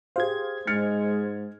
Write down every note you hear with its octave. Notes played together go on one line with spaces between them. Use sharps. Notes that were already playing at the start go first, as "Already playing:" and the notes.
G4 G#4 C5 F5 G#6
G#2 G#3 F6 A6 C#7